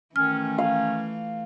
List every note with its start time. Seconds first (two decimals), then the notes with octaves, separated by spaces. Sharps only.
0.16 D#3 E3 A3 C#4 F6
0.58 F5